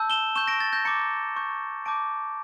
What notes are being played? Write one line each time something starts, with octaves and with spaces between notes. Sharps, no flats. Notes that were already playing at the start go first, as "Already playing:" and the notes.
Already playing: A5 E6 G6
E7 G7
C#6 G6 E7 G7
A#6 D7
A6
G6 A#6
A#5 D6 G6 A6 C#7
C#6 G6
A5 D6 G6 A#6 D7